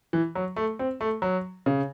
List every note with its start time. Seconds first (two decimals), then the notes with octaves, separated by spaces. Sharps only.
0.13 E3
0.35 F#3
0.56 A3
0.79 C4
1.01 A3
1.22 F#3
1.66 C#3